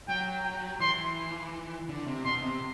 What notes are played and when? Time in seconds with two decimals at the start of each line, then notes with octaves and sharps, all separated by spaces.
0.09 F#3 G5
0.45 G5
0.80 E3 C6
1.89 D3
2.06 C3
2.24 B2 C6
2.42 C3